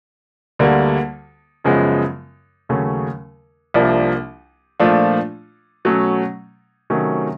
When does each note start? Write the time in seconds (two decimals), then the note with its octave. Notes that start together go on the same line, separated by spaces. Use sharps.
0.59 D2 D3 G3 A#3
1.64 F#2 C#3 F3 G#3 B3
2.69 D#2 C#3 F#3 A3 C#4
3.74 C2 C3 F3 A#3 D4
4.80 A#2 F3 A3 D4 F4
5.85 B2 F#3 A3 C#4
6.90 C3 D#3 F#3 A3 C#4